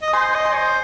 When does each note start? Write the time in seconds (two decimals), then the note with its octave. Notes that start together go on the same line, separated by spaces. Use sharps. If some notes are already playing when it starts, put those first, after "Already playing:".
0.02 D#5
0.08 D#6
0.13 C5 G#5 C6
0.35 D#5
0.45 G#5 C6
0.56 C5